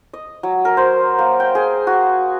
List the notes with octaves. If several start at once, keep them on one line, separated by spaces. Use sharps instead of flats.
D#5
F#3
A#4
C5
A#3
G5
G#4
F#4